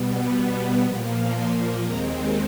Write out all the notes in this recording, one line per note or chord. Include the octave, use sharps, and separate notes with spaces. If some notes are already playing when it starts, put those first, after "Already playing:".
Already playing: B2 G3 B3
A#2 F3 A#3
C6
D#2 D#3 G#3 C4 A#5